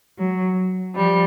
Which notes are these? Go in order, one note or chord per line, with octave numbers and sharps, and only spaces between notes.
F#3
F3 G3